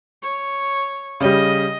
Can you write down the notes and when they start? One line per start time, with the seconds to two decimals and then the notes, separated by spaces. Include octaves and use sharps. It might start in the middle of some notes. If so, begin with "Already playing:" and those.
0.22 C#5
1.20 C#3 G3 D#5